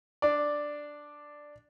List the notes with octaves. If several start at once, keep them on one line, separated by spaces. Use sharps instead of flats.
D4 D5